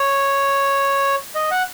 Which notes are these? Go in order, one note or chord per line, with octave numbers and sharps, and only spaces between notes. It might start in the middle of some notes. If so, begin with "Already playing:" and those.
Already playing: C#5
D#5
F#5